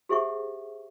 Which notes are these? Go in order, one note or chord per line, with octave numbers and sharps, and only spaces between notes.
G4 G#4 C5 E5 F#5 C#6